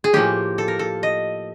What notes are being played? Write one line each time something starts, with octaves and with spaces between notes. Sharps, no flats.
G#4
A2 F3 A#3 G4
A4
A#4
A4
D#5